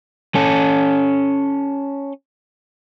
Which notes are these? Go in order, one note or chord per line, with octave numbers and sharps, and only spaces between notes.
C#4 A4